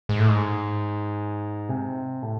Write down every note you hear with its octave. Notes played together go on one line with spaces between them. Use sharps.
G#2
A2
G#2
C3
A2